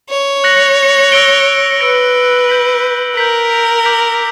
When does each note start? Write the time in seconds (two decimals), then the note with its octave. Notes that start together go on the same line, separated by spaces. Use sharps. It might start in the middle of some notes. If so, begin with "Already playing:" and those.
0.10 C#5
0.44 F#6 A#6 C#7 F#7
1.12 E6 A#6 D7 G7
1.80 B4 E6 A#6 D7 G7
2.48 G6 B6 F#7
3.16 A#4 G6 B6 F#7
3.84 D6 G6 B6 F#7